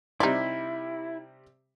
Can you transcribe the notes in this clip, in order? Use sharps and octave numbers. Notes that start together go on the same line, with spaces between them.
C3 G3 D#4 E4 D5 C6